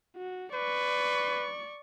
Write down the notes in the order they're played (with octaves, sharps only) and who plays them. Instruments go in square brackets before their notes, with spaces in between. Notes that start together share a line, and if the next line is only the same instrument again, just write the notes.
[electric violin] F#4
[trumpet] B4 [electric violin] D5 C#6